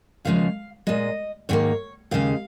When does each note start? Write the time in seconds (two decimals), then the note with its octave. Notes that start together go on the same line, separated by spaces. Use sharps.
0.25 D#2 C#3 F3 G#3 F5
0.87 A#2 G#3 D#5
1.49 G#2 D#3 A#3 C#5
2.11 D#2 C#3 G#3 F5